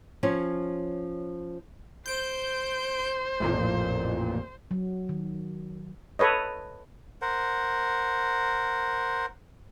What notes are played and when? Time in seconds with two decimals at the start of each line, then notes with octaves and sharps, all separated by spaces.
0.23 F3 C#4 C#5
2.06 C5 G6 D7
3.40 A1 F2 A#2
4.71 F#3
5.09 D#3
6.19 A4 B4 C#5 D#5
7.22 A#4 C5 F#5